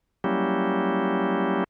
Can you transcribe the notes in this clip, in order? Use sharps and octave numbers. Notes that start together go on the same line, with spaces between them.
F#3 G3 A#3 C#4 E4 G4